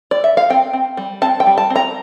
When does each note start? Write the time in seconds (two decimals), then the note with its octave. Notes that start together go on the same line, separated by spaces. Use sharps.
0.11 D5
0.24 E5
0.37 F5
0.50 C4 G5
0.73 C4
0.97 G3
1.22 C4 A5
1.40 G5
1.46 G3
1.58 A5
1.70 C4
1.76 A#5